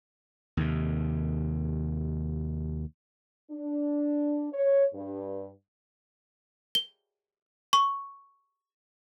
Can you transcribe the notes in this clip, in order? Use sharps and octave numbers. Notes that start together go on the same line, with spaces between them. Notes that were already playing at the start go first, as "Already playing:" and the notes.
D#2 C3
D4
C#5
G2
G7
C#6